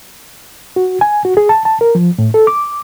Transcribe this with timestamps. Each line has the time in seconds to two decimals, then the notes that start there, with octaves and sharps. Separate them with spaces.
0.76 F#4
1.01 G#5
1.25 F#4
1.37 G#4
1.49 A5
1.65 A5
1.81 A#4
1.95 F3
2.19 A2
2.34 A4
2.47 D6